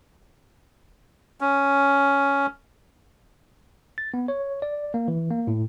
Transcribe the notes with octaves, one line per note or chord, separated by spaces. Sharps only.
C#4
A6
B3
C#5
D5
A#3
E3
A#3
A2